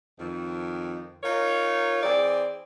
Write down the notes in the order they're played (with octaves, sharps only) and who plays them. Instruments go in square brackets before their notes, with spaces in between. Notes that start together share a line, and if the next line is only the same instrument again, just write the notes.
[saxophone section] F2 D#3
D#4 F4 A#4 C#5
E3 C4 G#4 D5